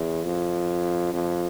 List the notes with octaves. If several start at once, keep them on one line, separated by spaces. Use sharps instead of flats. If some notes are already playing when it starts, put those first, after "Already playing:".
Already playing: E2
F2
F2